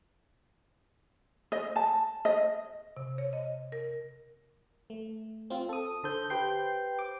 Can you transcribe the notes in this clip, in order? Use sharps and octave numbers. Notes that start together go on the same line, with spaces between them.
D#5
A5
D#5
C3
C#5
D#5
A#4
A3
C4 F4
A4 D#6
D3 A4 C5 G6
G4 B4 C5 G5 G6 C7
D6